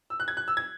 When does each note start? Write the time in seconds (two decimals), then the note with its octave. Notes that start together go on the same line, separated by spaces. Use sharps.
0.10 E6
0.20 F#6
0.28 G#6
0.37 F#6
0.48 E6
0.57 G#6